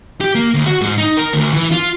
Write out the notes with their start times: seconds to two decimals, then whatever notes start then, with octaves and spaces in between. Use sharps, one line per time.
0.21 G4
0.35 A#3
0.54 D2
0.66 F#4
0.81 G#2
0.98 D#4
1.17 A#4
1.33 D2
1.53 E3
1.71 F4